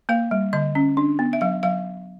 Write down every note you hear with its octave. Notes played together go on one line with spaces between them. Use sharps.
A#3 F5
G3
D3 D#5
C#4
D4
B3
E5
F#3 F5
F#3 F5